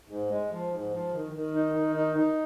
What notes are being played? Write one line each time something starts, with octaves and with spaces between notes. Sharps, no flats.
G#2
G#3
F3
G#2
F3
D#3
D#3
D#4
D#3
D#4
D#4